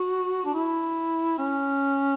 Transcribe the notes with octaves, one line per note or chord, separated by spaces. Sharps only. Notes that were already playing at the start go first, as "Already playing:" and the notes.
Already playing: F#4
D4
E4
C#4